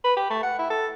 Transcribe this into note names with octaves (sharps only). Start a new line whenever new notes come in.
B4
G4
A3
F#5
E4
A4